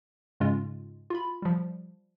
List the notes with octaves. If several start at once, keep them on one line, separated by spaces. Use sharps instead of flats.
G#2 C#3 G#3 C#4 F4
F4 B5
F3 G3